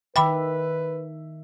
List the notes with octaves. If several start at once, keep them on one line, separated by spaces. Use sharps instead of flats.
D#3 B4 E5 G5 B5 D6